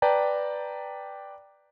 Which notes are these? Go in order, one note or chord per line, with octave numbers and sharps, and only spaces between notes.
B4 D5 G5 A5 A#5